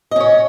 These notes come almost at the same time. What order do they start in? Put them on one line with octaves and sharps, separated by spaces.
D#5 C#4 C#5